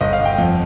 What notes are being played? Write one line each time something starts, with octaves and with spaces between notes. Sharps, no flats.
G1 D#5
F5
G1
G5
F2